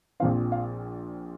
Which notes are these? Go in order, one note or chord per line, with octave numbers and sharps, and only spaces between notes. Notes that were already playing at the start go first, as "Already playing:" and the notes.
A#1 A#2 F3 C4 F5
F5